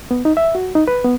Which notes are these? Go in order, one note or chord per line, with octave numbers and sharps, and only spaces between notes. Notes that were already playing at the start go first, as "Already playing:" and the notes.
B3
D#4
E5
F#4
D#4
B4
B3